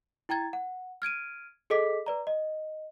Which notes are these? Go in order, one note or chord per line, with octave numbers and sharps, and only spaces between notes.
E4 G5 A#5 G#6 A6
F#5
F6 G#6 D7 D#7
G#4 A4 D#5 D6 B6
B4 D5 A#5
D#5